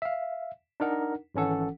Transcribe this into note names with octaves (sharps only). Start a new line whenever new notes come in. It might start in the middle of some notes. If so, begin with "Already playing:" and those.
E5 F5
D4 D#4 A#4 F#5
G#1 E3 C#4 A4 F#5